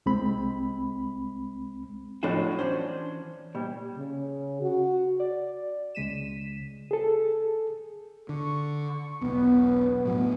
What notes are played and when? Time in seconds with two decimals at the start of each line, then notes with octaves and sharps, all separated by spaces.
0.06 C2 G#3 C4 B5
2.23 F2 A2 F#3 D4 F4 F#4
2.59 E3 C#4 D4 C5
3.55 A#2 G3
3.97 C#3
4.62 F#4
5.20 D5
5.95 C#2 C#3 G#3 B6 D#7 E7
6.91 G#4 A4
8.29 D3 C#6
9.21 E1 B1 B3
10.05 A2 F#3